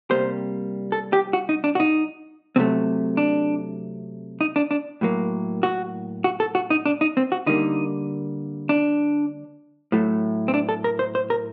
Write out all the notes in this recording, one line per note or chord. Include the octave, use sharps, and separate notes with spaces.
C3 G3 A#3 C5
A4
G4
F#4
D#4
D4
F#4
D#4
C3 F#3 A3 C4
D4
D#4
D4
D4
A2 F#3 A#3
F#4
F#4
A4
F#4
D#4
D4
D#4
C4
F#4
D3 G3 A#3 D#4
D4
A2 F#3 A3
C4
D4
A4
A#4
C5
C5
A#4